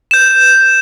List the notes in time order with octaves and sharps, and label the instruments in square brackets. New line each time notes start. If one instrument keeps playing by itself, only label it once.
[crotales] G6 E7